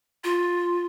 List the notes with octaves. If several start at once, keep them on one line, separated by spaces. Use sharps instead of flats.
F4